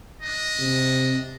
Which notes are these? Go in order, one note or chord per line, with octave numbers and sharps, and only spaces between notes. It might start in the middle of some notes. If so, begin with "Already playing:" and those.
D4 D#5
C3